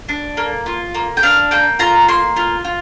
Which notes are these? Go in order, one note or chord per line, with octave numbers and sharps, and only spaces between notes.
D4
A#3
F4
A#3
G5
D4 F5
A#3 G5
F4 A#5
A#3 C6
F4
F4